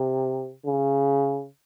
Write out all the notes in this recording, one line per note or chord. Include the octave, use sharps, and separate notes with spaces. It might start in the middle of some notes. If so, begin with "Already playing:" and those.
Already playing: C3
C#3